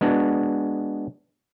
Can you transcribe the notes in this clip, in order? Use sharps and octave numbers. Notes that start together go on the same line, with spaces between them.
G#3 B3 D4 F#4